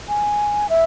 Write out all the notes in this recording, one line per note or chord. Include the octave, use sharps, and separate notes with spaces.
G#5
E5